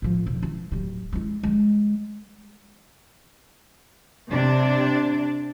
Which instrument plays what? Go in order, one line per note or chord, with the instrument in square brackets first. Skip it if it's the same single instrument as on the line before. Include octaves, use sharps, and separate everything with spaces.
[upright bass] A2 F3
E1
E3
D1 G3
G#3 E4
G3 G#3
[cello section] C3 D4 D5